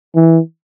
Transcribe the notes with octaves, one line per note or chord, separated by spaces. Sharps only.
E3